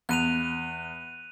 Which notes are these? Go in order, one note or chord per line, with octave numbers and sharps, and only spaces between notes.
E2 F#6 D#7 F7